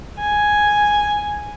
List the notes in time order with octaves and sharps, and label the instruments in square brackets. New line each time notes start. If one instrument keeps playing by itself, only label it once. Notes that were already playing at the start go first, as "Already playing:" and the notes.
[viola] G#5